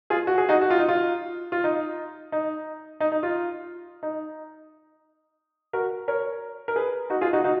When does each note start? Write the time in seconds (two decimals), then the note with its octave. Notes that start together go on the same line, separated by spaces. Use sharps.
0.10 F4 G#4
0.27 F#4
0.38 G#4
0.49 D#4 F#4
0.61 F#4
0.70 F4
0.79 D#4
0.88 F4
1.52 F4
1.64 D#4
2.32 D#4
3.00 D#4
3.12 D#4
3.23 F4
4.03 D#4
5.73 F#4 A#4
6.08 A#4 C#5
6.68 A#4
6.76 G#4 B4
7.10 D#4 F#4
7.21 F4 G#4
7.33 D#4 F#4
7.44 D#4 F#4